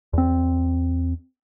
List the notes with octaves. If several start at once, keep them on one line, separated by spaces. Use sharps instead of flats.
E2 C4